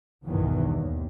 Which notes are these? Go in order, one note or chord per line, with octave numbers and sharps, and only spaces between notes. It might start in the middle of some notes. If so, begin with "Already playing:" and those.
B1 E2 G2 D#3 E3 F#3
D#2